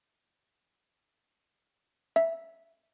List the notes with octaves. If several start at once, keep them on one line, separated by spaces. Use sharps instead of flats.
E5